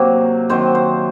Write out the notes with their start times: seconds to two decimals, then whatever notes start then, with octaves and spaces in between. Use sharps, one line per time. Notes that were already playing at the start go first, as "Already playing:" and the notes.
Already playing: C3 F#3 A#3
0.49 C3 D#3 F#3 C5
0.75 C5